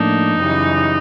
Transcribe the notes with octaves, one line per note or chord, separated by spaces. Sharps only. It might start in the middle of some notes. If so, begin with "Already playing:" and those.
Already playing: A2 F3 A#3 D4 D#4
F#2 C#3 E3 G3